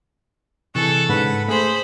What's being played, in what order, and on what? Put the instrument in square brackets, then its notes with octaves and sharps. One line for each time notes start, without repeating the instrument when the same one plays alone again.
[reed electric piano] C3 E3 [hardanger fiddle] G#4 A4 [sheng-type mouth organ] C#6 F#6
[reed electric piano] G#2 C#3 [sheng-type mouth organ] B4 F#5 B5
[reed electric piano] A3 [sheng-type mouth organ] G#4 [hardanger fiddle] C5 B5